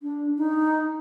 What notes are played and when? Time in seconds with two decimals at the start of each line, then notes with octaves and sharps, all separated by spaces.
0.03 D4
0.38 D#4